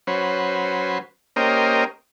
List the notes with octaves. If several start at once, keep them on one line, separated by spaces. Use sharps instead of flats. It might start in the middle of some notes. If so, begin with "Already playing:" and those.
F#3 C#4 B4 C5
A#3 C#4 G4 A#4 C5 D#5